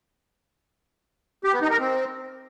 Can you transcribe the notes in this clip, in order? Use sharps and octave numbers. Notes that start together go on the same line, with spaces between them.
G4
B3
D#4
A#4
C4